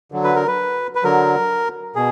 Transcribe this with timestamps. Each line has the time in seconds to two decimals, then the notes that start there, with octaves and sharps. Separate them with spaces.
0.12 D3 F#3
0.24 B4
0.35 A#4
0.48 B4
0.95 B4
1.04 D3 F#3 A#4
1.96 B2 G#4